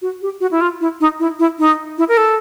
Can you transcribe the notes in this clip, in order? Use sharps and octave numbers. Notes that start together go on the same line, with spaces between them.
F#4
G4
F#4
E4
F4
E4
D#4
E4
E4
D#4
E4
A#4
A4